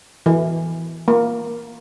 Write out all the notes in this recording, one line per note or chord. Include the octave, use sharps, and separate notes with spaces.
E3
A#3